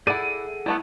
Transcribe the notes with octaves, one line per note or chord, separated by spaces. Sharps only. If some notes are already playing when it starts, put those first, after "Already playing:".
E4 G#4 A4 D5 F#5 D#7
G3 A3 B3 E4